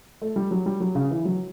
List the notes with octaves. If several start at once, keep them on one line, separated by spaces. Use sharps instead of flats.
A3
G3
F#3
G3
F#3
C#3
E3
F#3